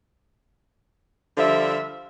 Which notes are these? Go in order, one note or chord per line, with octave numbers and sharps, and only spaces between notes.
D3 F3 G3 E5